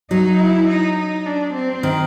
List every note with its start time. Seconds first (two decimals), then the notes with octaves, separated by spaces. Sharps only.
0.10 F#3 D#4
0.40 E4
0.68 D#4
0.98 D#4
1.26 D4
1.55 C4
1.83 D#3